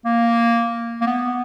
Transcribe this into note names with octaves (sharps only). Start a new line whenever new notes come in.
A#3
A#3
B3